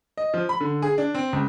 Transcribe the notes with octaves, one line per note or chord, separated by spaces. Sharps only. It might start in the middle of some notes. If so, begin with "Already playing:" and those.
D#5
F3
B5
D3
G#4
D4
C4
C#2